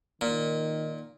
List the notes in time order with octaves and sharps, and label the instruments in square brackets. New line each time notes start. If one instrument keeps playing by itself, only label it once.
[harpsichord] A#2 [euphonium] D#3